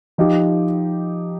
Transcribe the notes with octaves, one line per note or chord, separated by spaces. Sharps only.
F3 D#4 G4